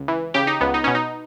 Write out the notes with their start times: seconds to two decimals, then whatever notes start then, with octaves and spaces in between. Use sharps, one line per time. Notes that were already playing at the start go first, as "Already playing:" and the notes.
Already playing: C#2
0.08 E3
0.34 C#3 G4
0.47 D#4
0.61 C#2 B3
0.74 D#4
0.84 B2 C#4
0.95 D#4